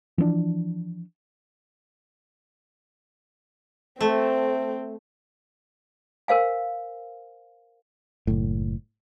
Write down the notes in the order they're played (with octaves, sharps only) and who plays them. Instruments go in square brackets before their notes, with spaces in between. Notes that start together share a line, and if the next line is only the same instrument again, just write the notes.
[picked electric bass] E3 F3 B3 D4
[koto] A3 [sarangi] C4
[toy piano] A#4 C5 F5 G#5
[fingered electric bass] F#1 A2